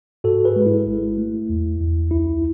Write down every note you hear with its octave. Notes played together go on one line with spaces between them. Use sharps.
G#2 F#4 A4
G#4 B4
G#3
E4
G#1
A3
E2
E2
C#2 E4